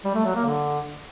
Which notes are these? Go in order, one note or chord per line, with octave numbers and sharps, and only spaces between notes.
G3
A3
F#3
A#3
D3